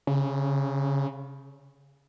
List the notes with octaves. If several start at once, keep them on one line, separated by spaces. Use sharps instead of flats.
C#3